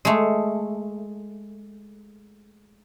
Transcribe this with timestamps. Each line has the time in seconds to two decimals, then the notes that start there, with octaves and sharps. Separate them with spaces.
0.05 G#3 A3